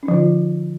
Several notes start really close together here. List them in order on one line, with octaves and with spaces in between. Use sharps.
C#4 D#4 F3 D3 F4